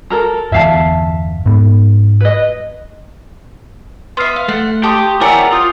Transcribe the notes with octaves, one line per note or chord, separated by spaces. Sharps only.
A4 A#4 A#5
G1 E2 E5 F5 A5
G#2 B3
B4 D#5
B3 E5 C6 F6 C7
F5
A3 F#5
G4 G5 A5 C6 C#6 D#6 G6
E4 G4 A#4 C#5 D5 F#5 G#5 E6
F4 D#6 G6